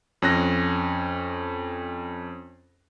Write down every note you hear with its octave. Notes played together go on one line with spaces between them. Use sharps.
F2 C#4 F#6 A#6